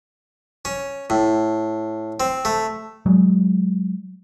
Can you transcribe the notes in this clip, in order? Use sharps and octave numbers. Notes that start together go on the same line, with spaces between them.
C#4
A2
C4
A3
F#3 G#3